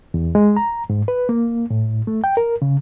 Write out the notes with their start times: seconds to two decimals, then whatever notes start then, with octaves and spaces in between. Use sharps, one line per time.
0.14 E2
0.35 G#3
0.57 A#5
0.90 G#2
1.08 B4
1.29 A#3
1.70 A2
2.07 A3
2.24 G5
2.37 A#4
2.62 C#3